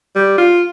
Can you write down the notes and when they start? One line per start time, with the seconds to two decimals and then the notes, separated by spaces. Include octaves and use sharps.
0.15 G3
0.38 F4